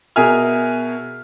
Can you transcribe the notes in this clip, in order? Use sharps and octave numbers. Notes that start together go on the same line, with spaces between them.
B2 G#4 A#4 E5 G#5 F6